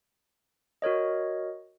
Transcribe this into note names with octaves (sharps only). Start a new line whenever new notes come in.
F#4 A#4 C#5 D#5